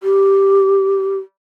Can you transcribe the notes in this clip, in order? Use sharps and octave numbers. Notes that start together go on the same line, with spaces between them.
G4